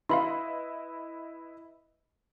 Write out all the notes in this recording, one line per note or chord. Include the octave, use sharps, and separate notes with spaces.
E4 B4 D#5 F5 B5 C6